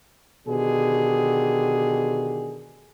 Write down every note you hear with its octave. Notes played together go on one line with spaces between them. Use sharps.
B2 D3 D#3 G4 G#4